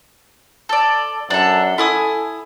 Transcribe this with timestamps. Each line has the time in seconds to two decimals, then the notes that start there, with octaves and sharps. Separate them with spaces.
0.69 A4 D5
1.30 F#2 D4 A4
1.78 E4 A4 G#5 D#6